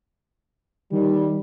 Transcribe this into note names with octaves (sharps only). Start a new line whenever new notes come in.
D#3 G3